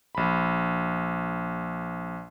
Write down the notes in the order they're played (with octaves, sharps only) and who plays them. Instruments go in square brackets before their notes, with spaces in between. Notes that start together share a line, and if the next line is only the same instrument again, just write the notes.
[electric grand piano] A#1 B5